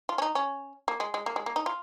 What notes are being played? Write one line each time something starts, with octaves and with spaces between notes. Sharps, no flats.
F4
C#4
D#4
C#4
A#3
G#3
G#3
A#3
G#3
A#3
D#4
F4